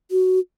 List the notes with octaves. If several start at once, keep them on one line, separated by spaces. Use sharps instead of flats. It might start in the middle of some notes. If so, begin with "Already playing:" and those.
F#4